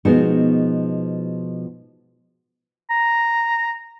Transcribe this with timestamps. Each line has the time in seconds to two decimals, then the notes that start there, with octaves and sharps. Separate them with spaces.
0.05 B2 F3 G#3 B3 D#4 F#4
2.90 A#5